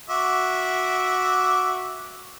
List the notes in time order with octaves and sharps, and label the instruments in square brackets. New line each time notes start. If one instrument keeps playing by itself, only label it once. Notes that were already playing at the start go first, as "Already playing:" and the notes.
[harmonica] F#4 E5 D6